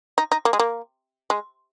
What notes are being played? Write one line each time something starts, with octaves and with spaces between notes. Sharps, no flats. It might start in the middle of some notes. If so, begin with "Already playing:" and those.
D#4
D#4
A#3
G#3
A#3
G#3